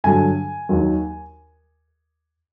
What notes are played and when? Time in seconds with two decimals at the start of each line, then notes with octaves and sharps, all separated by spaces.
0.04 G2 D3 F#3 G#5
0.69 D#2 D#3 F#3